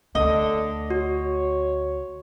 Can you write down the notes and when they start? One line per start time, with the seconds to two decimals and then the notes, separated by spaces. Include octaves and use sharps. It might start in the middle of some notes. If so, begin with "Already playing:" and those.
0.15 D2 D3 D#5
0.90 F#4 C#5